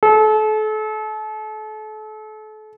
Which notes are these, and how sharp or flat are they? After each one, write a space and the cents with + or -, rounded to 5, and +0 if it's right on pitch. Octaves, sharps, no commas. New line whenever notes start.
A4 -35